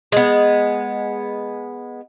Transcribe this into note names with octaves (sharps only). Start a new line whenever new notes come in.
G#3 B3